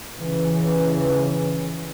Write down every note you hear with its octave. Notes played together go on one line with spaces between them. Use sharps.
C#3 E3